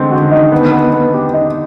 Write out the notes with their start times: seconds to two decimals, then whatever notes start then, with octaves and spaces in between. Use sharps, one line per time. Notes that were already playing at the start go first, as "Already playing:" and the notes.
Already playing: D3 E3 G#3 C4
0.11 F#4
0.22 D#3
0.31 D#4
0.52 B3
0.72 B3
0.93 B3
1.14 G4
1.33 D#4